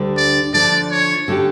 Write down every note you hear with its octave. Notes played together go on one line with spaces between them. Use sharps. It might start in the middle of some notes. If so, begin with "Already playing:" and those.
Already playing: D2 D3 G3
D5
D3 F3 A3 D4 D5
C#5
D3 A3 C#4 G4